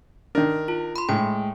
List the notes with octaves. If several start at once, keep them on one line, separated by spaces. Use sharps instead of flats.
D#3 D4 A#4
F4
B5 C6
A2 G#3 G5